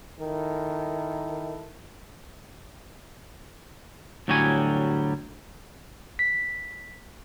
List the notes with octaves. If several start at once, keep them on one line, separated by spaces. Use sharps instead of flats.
D#3 E4 A4 A#4
D2 A2 F#3 G3 C#5 G#5
B6